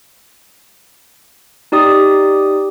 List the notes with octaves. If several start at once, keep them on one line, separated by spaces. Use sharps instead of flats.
D#4 G4 D5 D#6